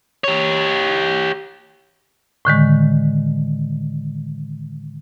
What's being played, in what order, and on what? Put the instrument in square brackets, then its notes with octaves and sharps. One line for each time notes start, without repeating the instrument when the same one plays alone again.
[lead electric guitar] G4 C#5
[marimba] A2 D3 D#3 G#3